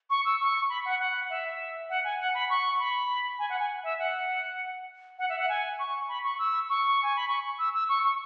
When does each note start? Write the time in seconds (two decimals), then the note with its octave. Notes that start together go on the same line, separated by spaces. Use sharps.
0.10 C#6
0.25 E6
0.40 C#6
0.69 B5
0.85 F#5
0.99 F#5
1.30 E5
1.90 F#5
2.04 G#5
2.20 F#5
2.34 B5
2.50 C#6
2.80 B5
3.39 G#5
3.50 F#5
3.59 G#5
3.84 E5
3.99 F#5
5.19 F#5
5.29 E5
5.39 F#5
5.49 G#5
5.79 C#6
6.08 B5
6.24 C#6
6.39 E6
6.69 C#6
7.03 G#5
7.16 B5
7.28 C#6
7.59 E6
7.74 E6
7.89 C#6
8.03 C#6